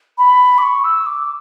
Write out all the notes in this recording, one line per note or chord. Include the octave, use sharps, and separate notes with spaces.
B5
D6
C#6
E6
D6